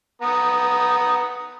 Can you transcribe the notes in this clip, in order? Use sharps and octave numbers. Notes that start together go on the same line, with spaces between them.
B3 A#5 D#6